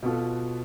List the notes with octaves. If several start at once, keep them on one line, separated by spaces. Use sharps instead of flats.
B2 B3 F4 A4